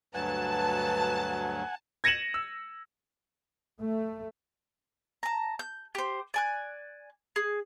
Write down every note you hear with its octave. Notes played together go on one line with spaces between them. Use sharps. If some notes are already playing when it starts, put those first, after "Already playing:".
D2 G2 F#3 B4 F#5 G#5 A5
G#6 A#6 C#7 D#7 E7 F#7
E6
A3
A5 A#5
G6
G4 C5
D5 G#5 F#6
G#4